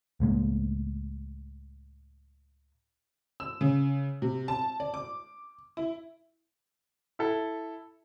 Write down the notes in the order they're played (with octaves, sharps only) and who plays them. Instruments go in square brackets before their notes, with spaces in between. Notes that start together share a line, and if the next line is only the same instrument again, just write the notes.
[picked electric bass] C#2 A2 G#3 A#3
[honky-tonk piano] E6
C#3
C3
A5
D5
D6
E4
[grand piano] E4 A4